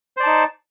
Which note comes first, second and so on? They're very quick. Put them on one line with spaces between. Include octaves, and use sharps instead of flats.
C5 D5 A5 D#4